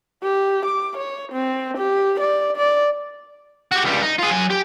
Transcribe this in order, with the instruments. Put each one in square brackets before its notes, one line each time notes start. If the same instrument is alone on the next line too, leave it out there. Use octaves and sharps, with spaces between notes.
[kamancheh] G4
D6
C#5
C4
G4
D5
D5
[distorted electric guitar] F#4 G4
C#2 G3
D#4
F4 G#4
F#3 G#5
G4